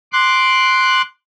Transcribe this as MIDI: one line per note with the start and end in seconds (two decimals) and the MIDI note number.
0.13 1.02 84
0.13 1.02 86
0.13 1.02 90